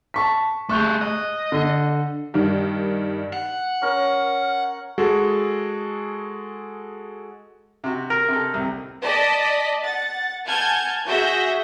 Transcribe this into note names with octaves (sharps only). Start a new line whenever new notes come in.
A5 C#6 B6
A3 G#4 C#6 F#6 G6
D#5 F#6
D3
G2 D#3 G3
F#5
C#4 A#4 C#5
G#3 F#4 G#4 A4
C3 F#4
A#4
C3 A4
C2
D5 D#5 A5 B6
F#5 A6
F#5 G#5 A5 F6 G6 G#6
F#4 G#4 E5 G6 A#6